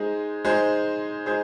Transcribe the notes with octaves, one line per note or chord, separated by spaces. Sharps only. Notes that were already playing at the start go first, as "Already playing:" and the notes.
Already playing: G#3 D#4 G#4 C5
G#3 D#4 G#4 C5
G#3 D#4 G#4 C5